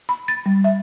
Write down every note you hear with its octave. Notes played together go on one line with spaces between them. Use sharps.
B5
A6
G3
E5